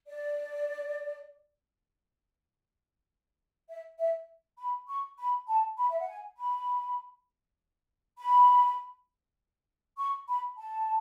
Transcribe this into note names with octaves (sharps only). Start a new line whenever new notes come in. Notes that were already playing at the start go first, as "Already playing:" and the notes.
D5
E5
E5
B5
C#6
B5
A5
B5
E5
F#5
G#5
B5
B5
C#6
B5
A5